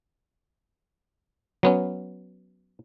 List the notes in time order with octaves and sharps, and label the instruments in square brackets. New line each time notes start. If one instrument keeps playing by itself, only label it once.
[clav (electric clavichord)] F#3 B3 C#4